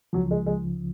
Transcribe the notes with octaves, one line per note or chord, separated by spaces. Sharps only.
C#2 C#3 F3 F#3
G#3
G#3